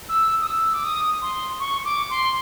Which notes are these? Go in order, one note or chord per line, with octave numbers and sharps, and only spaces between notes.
E6
D#6
E6
D6
D#6
C6
C#6
D6
C6